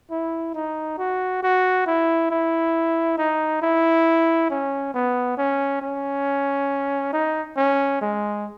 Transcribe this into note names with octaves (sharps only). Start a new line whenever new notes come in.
E4
D#4
F#4
F#4
E4
E4
D#4
E4
C#4
B3
C#4
C#4
D#4
C#4
G#3